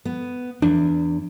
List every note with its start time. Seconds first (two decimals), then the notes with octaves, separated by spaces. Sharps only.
0.05 B3
0.62 E2 D4